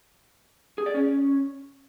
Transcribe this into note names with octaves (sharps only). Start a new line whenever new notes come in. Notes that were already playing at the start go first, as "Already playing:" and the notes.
G#4
D5
C#4